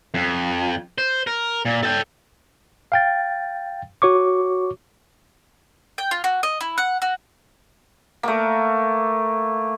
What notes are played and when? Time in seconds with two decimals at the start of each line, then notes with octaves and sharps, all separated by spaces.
0.14 F2
0.98 C5
1.27 A#4
1.65 A#2
1.83 A4 G5
2.92 F5 G5 A6
4.02 F#4 C#5 C#6 D6
5.98 G5
6.11 F4
6.24 F#4
6.43 D#5
6.61 E4
6.78 F#5
7.02 F#4
8.23 A3 A#3